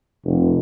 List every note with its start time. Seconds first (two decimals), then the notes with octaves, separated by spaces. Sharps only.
0.25 F1